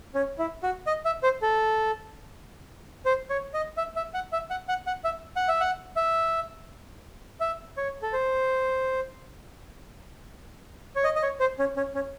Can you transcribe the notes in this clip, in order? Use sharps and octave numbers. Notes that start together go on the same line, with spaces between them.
C#4
E4
F#4
D#5
E5
C5
A4
C5
C#5
D#5
E5
E5
F#5
E5
F#5
F#5
F#5
E5
F#5
E5
F#5
E5
E5
C#5
A4
C5
C#5
D#5
D#5
C#5
C5
C#4
C#4
C#4